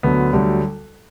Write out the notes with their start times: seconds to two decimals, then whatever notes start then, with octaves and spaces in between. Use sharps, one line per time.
0.03 D2 D3 F#3 B3
0.33 D2 D3 F#3 G3